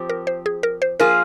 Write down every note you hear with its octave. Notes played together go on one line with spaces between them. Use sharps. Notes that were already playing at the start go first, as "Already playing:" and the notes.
Already playing: F3 C4 G4
A#4
C5
G#4
A#4
C5
F3 A#3 F4 G#4 A#4